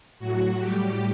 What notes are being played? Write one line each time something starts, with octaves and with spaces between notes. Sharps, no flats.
A2 F#3 F#4
A2 G3 G4